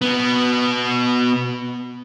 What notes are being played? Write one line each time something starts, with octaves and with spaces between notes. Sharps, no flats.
B2 B3